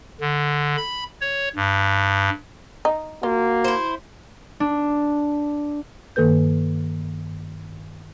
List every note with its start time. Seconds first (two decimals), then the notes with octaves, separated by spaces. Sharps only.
0.21 D3
0.77 B5
1.21 C#5
1.56 G2
2.85 D#4
3.23 A#3 F4 F#4
3.64 E4 C5
4.60 D4
6.16 G2 D#3 A#3 A4 B4 G6